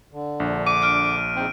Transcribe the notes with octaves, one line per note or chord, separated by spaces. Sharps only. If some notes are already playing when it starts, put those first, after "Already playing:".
D3
A#1 D4
D6 D#7
F6 D7
C#3 C4 D#4